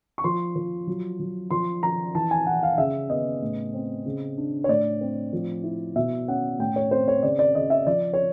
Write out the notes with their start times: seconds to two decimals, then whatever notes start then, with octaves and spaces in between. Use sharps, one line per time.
0.18 C#6
0.24 F3 C6
0.56 F3
0.87 F#3
1.20 F#3
1.51 F3 C6
1.83 F3 A#5
2.15 E3 A5
2.31 G#5
2.46 E3 F#5
2.63 F5
2.78 C#3 E5
3.10 B3 D#5
3.42 A2
3.74 C4
4.06 C#3
4.38 D4
4.64 C#5
4.68 A2 D5
5.01 C4
5.33 F3
5.64 E4
5.96 B2 E5
6.28 C#4 F#5
6.59 A2 G5
6.76 C#5
6.91 C4 C5
7.08 C#5
7.23 C#3 D5
7.39 D5
7.55 C#3 D#5
7.70 E5
7.87 F3 D5
8.13 C#5